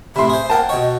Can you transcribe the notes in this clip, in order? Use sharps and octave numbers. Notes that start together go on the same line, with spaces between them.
A2 C3 E5 B5 C6
G#4 C5
A#4 F#5 G5 A5
B2 C#5 D#5